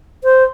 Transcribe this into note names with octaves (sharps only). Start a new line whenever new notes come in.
C5